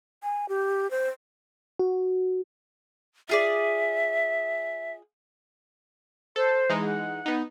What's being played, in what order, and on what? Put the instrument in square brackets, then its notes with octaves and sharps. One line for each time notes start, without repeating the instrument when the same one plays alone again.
[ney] G#5
G4
C5
[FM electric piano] F#4
[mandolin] F4 G#4 D5 [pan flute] E5
[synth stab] A4 [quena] C5
[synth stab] E3 G#3 D#4
[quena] F#5
[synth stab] B3 D#4